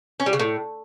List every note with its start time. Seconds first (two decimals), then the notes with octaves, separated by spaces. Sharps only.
0.20 C#4
0.26 G3
0.33 C#3
0.39 A2